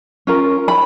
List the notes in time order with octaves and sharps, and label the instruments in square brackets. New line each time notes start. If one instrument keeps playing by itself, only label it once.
[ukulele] C#4 F4 A#4
B5